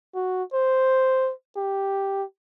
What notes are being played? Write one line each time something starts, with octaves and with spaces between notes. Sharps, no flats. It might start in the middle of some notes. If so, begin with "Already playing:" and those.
F#4
C5
G4